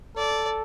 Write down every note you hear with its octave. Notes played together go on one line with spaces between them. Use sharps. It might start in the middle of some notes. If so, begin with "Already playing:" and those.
A4 D5